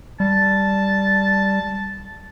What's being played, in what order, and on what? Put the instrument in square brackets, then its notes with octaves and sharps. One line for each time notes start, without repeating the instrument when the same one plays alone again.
[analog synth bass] G3 [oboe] A5